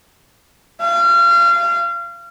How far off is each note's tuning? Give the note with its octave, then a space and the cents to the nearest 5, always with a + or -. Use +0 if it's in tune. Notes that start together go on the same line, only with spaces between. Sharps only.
F5 -30